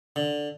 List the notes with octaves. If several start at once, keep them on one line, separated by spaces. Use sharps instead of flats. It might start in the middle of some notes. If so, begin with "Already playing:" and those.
D3